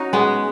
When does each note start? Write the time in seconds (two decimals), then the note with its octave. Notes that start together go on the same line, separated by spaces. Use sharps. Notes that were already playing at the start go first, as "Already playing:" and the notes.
Already playing: C#4 D#4 F#4
0.13 G#3 B3